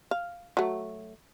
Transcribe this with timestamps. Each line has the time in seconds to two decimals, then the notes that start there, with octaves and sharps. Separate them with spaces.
0.11 F5
0.57 F#3 A3